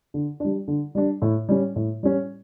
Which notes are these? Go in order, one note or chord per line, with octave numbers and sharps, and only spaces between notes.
D3
G3 D4
D3
G3 D4
A2
G3 C#4
A2
G3 C#4